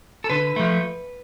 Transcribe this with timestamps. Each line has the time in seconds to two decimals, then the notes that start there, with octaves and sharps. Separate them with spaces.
0.24 A4
0.30 D3 B4
0.56 F3 A3